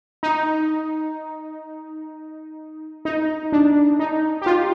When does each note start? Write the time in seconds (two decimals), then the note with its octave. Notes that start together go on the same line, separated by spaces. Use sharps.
0.23 D#4
3.05 D#4
3.52 D4
3.99 D#4
4.42 G4
4.46 F4